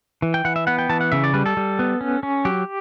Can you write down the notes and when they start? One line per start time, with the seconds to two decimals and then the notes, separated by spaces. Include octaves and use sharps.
0.22 E3
0.34 G5
0.45 E3 F#5
0.56 E5
0.67 B3 F#5
0.79 G5
0.89 E3 A5
1.01 F#5
1.12 C#3 E5
1.24 D5
1.34 G3 B4
1.46 A4
1.57 G3
1.79 B3
2.01 C#4
2.23 C#4
2.45 F#3 G4